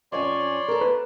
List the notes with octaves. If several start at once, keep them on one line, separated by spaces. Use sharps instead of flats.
F2 C#4 C#5 D5 G#5 C6
A4 A#4
B4